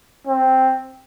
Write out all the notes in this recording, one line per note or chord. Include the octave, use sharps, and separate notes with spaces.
C4